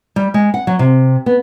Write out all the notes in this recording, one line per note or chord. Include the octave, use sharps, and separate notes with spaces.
G3
G#3
F#5
F#3
C3
B3